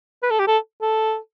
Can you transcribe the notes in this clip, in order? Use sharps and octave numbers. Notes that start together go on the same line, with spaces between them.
B4
A4
G4
A4
A4